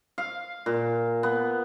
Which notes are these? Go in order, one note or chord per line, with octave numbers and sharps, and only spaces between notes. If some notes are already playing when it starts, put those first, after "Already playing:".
F5
A#2
B3